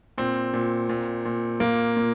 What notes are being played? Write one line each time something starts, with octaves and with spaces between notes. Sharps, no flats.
A#2 C4
A#2
A#2
A#2
A#2 A#3
A#2